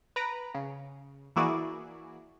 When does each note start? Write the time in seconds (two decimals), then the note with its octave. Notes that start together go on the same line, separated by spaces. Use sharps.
0.16 B4 A#5 D7
0.54 C#3
1.36 E3 A#3 E4 F#4 G#4 D5